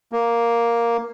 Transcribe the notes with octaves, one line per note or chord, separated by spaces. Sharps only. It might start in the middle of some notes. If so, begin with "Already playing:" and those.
A#3